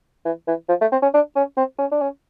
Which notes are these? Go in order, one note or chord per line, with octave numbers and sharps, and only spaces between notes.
E3
E3
F3
A3
C4
C#4
D4
C#4
C4
C#4
D4
C#4